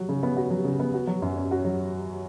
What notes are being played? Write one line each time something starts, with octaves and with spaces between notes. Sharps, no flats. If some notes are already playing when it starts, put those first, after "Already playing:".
Already playing: F#3 F#4
C#3
B3
F#4
F#3
C#3
B3
F#4
F#3
F#2
C#4
F#4
F#3